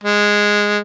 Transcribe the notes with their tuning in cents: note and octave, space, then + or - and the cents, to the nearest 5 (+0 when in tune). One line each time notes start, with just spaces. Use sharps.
G#3 -5